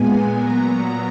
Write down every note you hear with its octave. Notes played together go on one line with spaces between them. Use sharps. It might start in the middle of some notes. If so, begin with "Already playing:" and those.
Already playing: A#2 G#3 B3 G#5
G#5
A#2 F#3 B3 A#5